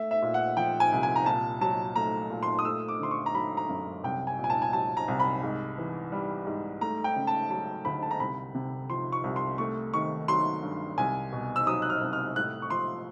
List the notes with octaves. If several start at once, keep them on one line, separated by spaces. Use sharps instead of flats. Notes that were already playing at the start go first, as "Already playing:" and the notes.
Already playing: A3 E5
E5
A#2
F#5
F3 G5
G#5
C2
G#5
A#5
A#2 A5
F#3 A5
A3 A#5
A#2
C6
D#6
A3 E6
D6
D3 C6
C#6
A#5
F#3 B5
A#5
F#2
C2 G5
G#5
A#2
G#5
A5
G#5
F#3 A5
A#5
C2
B5
G#2
E3
G3
G#2
A3 A#5
G5
C#3
A5
F#3 A5
D2 B5
A5
A#5
C2 B5
C3
F3 C6
C#6
C2
C6
A3 C#6
D#3 C#6
F#3 C6
G2
C2 G#5
B2
E6
F#3 D#6
F#6
F6
C2
F6
A2 F#6
C#6
F3 C6